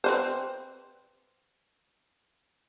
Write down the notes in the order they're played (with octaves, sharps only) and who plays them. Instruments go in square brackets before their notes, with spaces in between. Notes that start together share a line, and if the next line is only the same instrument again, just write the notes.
[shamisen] C4 B4 C5